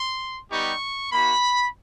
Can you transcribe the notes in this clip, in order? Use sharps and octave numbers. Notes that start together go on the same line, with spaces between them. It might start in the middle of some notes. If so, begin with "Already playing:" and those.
Already playing: C6
G3 B3 D#4 G4 C#6
A#3 D#4 F#4 B5